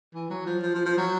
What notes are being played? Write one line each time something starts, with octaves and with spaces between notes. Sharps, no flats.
E3
F#3
F3
F3
F3
F3
F#3